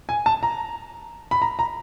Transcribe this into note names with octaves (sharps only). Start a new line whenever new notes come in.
G#5
A5
A#5
B5
A#5
A#5